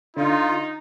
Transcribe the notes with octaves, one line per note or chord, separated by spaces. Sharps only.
D3 D#4 F4